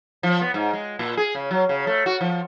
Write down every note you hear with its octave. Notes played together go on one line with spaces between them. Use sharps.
F3
B3
G#2
G#3
A#2
G#4
C#3
F#3
C#3
A3
F#4
F3